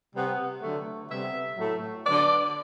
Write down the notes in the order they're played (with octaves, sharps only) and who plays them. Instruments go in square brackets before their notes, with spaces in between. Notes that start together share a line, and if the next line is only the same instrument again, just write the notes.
[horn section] C3 G3 B3
D3 F#3 A3
C3 G3 B3 E5
A2 F#3 A3
D3 F#3 B3 D5